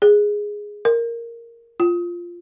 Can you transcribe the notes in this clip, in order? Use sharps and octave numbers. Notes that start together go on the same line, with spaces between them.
G#4
A#4
F4